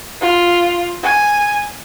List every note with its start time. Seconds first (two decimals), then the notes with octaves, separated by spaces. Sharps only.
0.21 F4
1.03 G#5